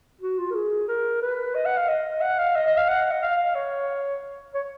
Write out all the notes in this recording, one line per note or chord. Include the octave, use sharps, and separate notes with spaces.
F#4
F4
A#4
G#4
A#4
B4
D#5
F#5
F5
D#5
F#5
F5
D#5
D#5
F5
F#5
D#5
F5
C#5
C#5